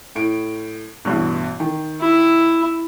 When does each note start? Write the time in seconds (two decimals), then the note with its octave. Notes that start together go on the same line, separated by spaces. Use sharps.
0.15 A2 D7
1.05 A1 G2 B2
1.60 D#3
2.01 E4